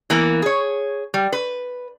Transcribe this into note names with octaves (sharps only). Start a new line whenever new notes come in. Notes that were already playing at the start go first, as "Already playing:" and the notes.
E3 A#3 B3
G#4 C#5
G3
B4